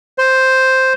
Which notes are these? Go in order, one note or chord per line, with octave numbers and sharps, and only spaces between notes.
C5